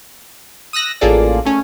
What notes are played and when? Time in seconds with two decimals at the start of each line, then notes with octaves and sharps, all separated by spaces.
0.73 D#6 E6 F#6 A#6
1.01 A1 A#3 F4 G#4 A4 D5
1.45 A3 C#4